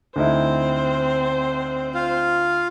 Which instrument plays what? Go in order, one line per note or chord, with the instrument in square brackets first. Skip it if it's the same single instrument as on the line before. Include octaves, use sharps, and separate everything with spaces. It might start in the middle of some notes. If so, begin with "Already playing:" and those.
[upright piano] D2 D#4 E4 [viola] C4 C5
[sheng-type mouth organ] F4 F5